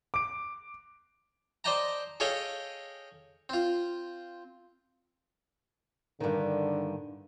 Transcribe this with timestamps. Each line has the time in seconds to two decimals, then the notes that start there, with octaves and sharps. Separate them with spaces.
0.14 D6 D7
1.64 C5 D5 D#5 G5 A5 A#5
2.20 G#4 A4 C#5 D#5 F5 G5
3.49 C4 F4
6.20 G2 D3 D#3